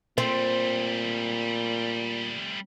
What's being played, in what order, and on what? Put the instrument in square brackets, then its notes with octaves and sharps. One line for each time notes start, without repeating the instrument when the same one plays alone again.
[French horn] A#2 [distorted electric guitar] G3 A3 [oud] C4